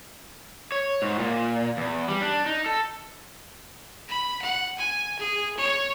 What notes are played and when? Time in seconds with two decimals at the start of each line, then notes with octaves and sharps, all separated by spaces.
0.72 C#5
1.02 G#2
1.19 A#2
1.77 E2
2.09 G3
2.22 D4
2.46 D#4
2.66 A4
4.09 B5
4.42 F#5
4.79 G#5
5.19 G#4
5.57 C#5